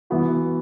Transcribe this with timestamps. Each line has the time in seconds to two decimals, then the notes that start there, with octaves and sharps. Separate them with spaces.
0.10 E3 B3 F#4